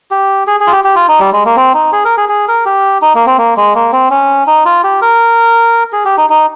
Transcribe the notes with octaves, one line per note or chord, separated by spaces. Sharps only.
G4
G#4
G#4
F4
G4
G4
F4
D#4
G3
G#3
A#3
C4
D#4
G#4
A#4
G#4
G#4
A#4
G4
D#4
A#3
C4
A#3
G#3
A#3
C4
C#4
D#4
F4
G4
A#4
G#4
G4
D#4
D#4